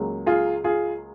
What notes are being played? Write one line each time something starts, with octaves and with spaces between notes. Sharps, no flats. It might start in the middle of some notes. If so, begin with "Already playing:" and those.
Already playing: C#2 C#3 F#3 A#3
F4 G#4
F4 G#4